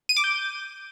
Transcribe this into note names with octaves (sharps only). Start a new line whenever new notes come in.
D#7
D6
G6